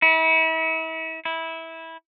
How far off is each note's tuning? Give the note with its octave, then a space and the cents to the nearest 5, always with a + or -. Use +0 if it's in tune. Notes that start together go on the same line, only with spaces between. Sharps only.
E4 -35
E4 -15